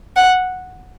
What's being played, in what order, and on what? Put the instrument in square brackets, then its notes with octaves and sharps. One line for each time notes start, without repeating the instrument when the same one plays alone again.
[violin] F#5